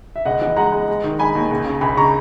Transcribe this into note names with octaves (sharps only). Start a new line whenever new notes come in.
E5
C#2 D#5 F#5
E3 D#5 F#5
G#3 F#5 A#5
G#3
G#3
D#3
G#3 G#5 B5
D#2
C#2
C#3
C#2 G#5 B5
C#3 A#5 C#6